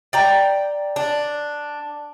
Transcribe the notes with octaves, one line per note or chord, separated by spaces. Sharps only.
D5 G5 A#5
D4